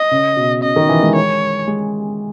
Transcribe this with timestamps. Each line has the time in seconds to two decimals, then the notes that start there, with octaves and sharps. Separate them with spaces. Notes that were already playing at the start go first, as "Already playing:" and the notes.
Already playing: D#5
0.11 C#3
0.36 B2
0.63 C#3 D#5
0.76 D#3
0.89 E3
1.02 G#3
1.15 C#5
1.67 G#3